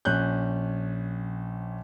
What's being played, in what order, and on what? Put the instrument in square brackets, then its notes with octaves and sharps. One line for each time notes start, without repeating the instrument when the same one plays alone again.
[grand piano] A#1 C#4 F#6 G6